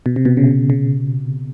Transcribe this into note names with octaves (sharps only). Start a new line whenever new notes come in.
B2
C3
B2
C#3
C#3